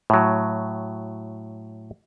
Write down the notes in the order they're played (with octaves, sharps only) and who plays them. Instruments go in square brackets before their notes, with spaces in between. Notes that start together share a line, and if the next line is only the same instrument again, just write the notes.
[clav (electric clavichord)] A2 F#3